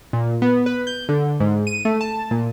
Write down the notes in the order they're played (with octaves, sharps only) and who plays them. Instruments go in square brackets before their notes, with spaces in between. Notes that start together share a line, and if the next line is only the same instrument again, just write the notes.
[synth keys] A#2
B3
B4
G6
D3
G#2
D#7
A3
A5
A#2